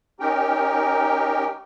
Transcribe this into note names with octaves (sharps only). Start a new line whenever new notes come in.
C#4 D#4 G4 A#4 G5